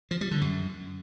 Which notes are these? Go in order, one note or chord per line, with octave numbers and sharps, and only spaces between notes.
F3
G3
D3
F#2